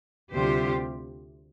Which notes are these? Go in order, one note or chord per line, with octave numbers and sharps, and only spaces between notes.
D2 C3 G3 F4 G4 C5